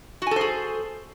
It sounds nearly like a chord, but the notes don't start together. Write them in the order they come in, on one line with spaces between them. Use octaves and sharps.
F#4 G#5 A4 C5 G#4